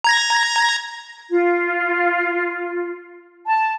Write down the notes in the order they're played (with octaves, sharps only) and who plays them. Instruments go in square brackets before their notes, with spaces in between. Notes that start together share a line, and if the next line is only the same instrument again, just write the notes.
[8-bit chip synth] A#5 G#6 A#6
[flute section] F4
A5